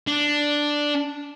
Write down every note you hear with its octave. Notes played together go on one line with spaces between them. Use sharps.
D4